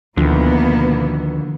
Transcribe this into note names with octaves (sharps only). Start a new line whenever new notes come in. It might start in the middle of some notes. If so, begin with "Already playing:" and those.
D2 B2 D3 D#3 F3 A#3 B3